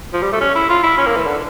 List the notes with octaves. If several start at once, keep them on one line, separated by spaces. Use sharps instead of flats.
F3
G3
A3
C#4
E4
F4
E4
C#4
A#3
E3
D3